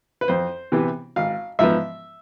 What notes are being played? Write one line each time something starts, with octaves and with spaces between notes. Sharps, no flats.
B4
F2 C5
C3 E3 B3
G#1 F5
G#2 F3 B3 E5